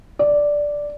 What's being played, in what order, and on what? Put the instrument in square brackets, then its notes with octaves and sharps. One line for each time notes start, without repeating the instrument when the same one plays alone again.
[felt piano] D5